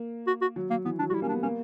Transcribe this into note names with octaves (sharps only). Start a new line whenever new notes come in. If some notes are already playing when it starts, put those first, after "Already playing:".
Already playing: A#3
F#4
F#4
F#3
F#3 A#3
E3 B3
F#3 D4
G3 F#4
E4
A#3 C#4
D4
B3
A#3 C#4